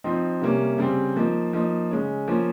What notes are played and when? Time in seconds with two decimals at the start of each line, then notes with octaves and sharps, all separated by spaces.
0.04 F3 C4 D#4
0.41 C3 G3 A#3 C#4
0.78 C#3 G3 C4
1.16 F3 A#3 D#4
1.53 F3 A#3 D#4
1.91 C#3 G#3 C#4
2.28 F3 A#3 C#4